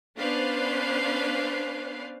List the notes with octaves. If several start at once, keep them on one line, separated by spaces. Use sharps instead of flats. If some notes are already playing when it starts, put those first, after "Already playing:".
B3 C#4 D4 B4 C5 F5